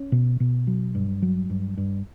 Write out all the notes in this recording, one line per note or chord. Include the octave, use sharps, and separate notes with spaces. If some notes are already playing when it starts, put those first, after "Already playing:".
Already playing: C#4
B2
B2
F#3
G2
F#3
G2
G2